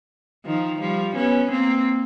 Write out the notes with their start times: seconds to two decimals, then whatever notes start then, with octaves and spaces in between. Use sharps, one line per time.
0.45 D#3 F3
0.80 F3 G3
1.16 B3 C#4
1.51 A#3 C4